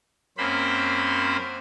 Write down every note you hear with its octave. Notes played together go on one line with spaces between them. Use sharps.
F#2 A#3 C4 C#4 C5 B5